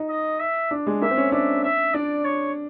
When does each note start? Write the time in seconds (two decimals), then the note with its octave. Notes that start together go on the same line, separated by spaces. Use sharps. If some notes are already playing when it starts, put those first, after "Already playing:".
Already playing: D#4
0.10 D#5
0.40 E5
0.71 D4
0.87 G#3
1.02 A#3 E5
1.11 C4
1.17 C#4
1.32 D4 E5
1.63 E5
1.94 D4 D5
2.25 C#5